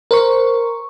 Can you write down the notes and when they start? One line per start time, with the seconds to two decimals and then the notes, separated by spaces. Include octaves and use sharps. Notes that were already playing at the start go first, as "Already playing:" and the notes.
0.11 A#4 C5 C#6